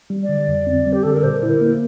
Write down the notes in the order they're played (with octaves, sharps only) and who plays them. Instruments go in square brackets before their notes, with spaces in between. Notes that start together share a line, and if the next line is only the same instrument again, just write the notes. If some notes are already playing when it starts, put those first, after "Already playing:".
[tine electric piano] G3
[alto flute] D5
[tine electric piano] D3
F2
C4
G3
[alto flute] G4
[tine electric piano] D3 [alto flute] A4
[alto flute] A#4
[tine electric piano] A#2 [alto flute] C5
[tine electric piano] E4
[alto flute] A#4
[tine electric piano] A#3